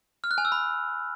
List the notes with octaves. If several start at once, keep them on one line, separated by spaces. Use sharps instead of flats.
F6
F#6
G#5
E6
B5